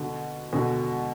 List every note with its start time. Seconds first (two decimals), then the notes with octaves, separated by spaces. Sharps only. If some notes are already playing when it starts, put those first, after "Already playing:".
Already playing: B2 D3
0.53 B2 D3